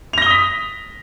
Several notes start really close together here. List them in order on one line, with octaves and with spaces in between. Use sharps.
F7 A#6 G7 D#6 B6